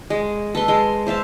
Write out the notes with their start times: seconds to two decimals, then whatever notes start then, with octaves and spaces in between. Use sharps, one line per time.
0.10 G#3
0.55 A4 B4 C6
0.68 G#3 C6
1.07 C5 E5 F5 A5